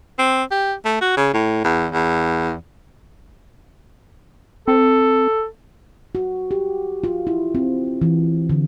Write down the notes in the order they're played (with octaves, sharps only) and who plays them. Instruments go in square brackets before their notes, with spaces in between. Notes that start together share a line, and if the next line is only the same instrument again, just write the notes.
[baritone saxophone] C4
G4
A3
F#4
C#3
A2
E2
E2
[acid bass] C4 [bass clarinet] A4
[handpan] F#4
G4
F4
E4
C4
E3
D3